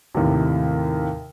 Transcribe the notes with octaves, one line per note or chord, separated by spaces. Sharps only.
D#2 A2 C3